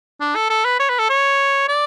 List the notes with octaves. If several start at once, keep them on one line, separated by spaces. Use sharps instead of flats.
D4
A4
A4
B4
C#5
B4
A4
C#5
D5